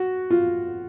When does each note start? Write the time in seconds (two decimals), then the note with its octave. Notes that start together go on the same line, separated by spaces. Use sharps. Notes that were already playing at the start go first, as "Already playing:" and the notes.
Already playing: F#4
0.31 F4